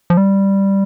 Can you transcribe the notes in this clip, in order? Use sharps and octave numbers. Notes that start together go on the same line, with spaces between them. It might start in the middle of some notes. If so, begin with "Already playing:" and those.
F3
G3